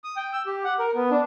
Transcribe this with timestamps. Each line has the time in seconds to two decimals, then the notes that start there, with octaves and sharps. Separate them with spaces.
0.04 D#6
0.16 G5
0.33 E6
0.46 G4
0.64 F#5
0.79 A#4
0.95 B3
1.11 D4